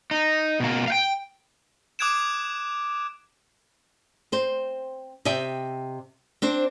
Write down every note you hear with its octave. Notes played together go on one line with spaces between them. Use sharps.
D#4
B2 A#3
F5 G5
D6 D#6 F#6 G#6 D7 E7
C4 C5
C3 D#5 E5 G5
C4 D4 C5